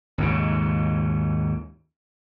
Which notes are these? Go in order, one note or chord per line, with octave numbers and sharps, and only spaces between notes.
D#2 G#2 C#3